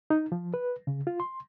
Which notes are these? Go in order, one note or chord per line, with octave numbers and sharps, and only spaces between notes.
D#4
F3
B4
C#3
F4
C6